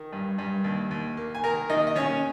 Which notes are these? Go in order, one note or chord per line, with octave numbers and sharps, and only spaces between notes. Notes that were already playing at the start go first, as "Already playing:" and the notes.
Already playing: D#3
G2
G2
D#2
D#2
A#3
G#5
D#3 A#4 A#5
D#2 D#4 D#5
D#5
D#2 C#4 C#5